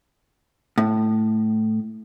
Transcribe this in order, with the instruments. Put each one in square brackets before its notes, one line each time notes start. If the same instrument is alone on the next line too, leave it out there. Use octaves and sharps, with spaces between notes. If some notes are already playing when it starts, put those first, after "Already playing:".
[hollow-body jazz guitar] A2